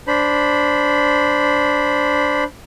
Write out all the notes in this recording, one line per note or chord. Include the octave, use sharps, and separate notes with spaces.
D4 C5 B5